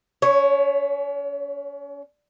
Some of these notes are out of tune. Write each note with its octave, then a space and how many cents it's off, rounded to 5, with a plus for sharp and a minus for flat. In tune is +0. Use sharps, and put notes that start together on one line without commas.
C#4 +40 C#5 +0